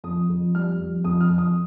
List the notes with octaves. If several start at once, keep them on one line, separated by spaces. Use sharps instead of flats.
F2 D#6
F2
G3 F6
F2
F2 D#6
F6
F2
D#6